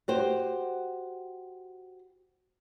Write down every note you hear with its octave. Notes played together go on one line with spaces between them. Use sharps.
F#4 G4 C5